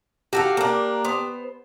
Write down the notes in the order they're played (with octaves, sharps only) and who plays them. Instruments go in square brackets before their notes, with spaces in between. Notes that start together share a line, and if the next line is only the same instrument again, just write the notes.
[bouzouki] F#4 A4 F5 [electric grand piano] G4
[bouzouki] A#3 D4
B3 C5